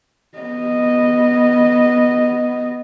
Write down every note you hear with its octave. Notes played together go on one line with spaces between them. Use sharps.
B3 D#5